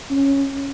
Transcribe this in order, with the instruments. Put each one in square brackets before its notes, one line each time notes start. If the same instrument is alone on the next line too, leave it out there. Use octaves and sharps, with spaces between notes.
[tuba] C#4